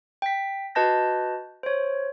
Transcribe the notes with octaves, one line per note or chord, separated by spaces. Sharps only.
G5 B6
F#4 B4 D#5 A5 G6 A#6
C5 C#5